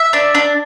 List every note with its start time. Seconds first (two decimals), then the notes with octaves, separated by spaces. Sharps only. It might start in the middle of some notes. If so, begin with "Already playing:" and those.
Already playing: E5
0.13 D4
0.35 D4